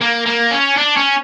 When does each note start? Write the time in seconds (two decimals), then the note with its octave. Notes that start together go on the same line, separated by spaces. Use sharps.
0.01 A#3
0.26 A#3
0.51 C#4
0.77 D4
0.96 C#4